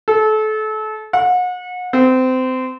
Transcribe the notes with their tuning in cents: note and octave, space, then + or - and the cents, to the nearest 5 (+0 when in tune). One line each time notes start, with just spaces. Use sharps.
A4 -30
F#5 -35
C4 -25